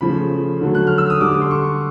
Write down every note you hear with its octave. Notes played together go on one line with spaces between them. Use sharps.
C#3 F3 A3 B5
D3 F#3 A3
F#6
F6
E6
D#6
D3 G3 D6
C6
C#6